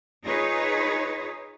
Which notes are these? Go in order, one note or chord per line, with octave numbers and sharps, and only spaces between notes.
D#4 F4 G#4 B4 C#5